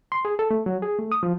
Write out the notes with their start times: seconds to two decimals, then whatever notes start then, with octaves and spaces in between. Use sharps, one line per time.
0.12 C6
0.25 G#4
0.39 A4
0.51 A3
0.66 F#3
0.82 G#4
0.99 A3
1.12 D#6
1.23 F3